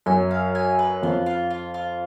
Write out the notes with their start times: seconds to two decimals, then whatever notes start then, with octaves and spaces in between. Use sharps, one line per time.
0.06 F#2 G#5
0.31 F5
0.55 G#5
0.79 B4
1.03 F2 F4
1.26 F4
1.51 F4
1.74 F4